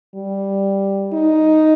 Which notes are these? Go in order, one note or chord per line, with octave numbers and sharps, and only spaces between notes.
G3
D#4